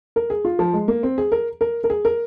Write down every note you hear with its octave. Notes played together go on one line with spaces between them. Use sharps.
A#4
G#4
F4
F3
G#3
A#3
C4
G#4
A#4
A#4
A#4
G#4
A#4